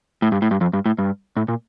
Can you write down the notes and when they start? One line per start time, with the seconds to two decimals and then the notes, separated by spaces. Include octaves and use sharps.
0.22 A2
0.32 G2
0.42 A2
0.51 G2
0.61 F2
0.73 G2
0.86 A2
0.98 G2
1.37 A2
1.48 A#2